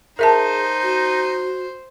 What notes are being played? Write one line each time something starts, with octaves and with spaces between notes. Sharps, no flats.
D#4 G#4 A#4 C5 E5 A5
F#4